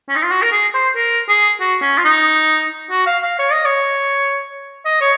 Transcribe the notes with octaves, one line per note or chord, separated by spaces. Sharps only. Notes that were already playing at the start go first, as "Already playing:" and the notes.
C#4
D#4
F4
F#4
A#4
G#4
C5
A#4
G#4
F#4
C#4
F4
D#4
F#4
F5
F5
C#5
D#5
C#5
D#5
C#5